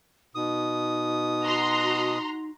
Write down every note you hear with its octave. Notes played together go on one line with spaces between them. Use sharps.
B2 D#4 D#6
F#4 A#5 C6